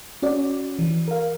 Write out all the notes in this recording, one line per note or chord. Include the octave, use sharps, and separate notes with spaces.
C#4 F#4 D5
E3
A#4 F5